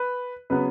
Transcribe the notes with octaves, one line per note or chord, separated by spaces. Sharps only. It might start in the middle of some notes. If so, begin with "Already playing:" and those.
Already playing: B4
C#3 F#3 B3 B4